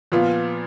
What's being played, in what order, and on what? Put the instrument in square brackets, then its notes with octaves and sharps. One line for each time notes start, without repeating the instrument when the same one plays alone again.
[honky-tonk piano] A#2 F3 B3 F4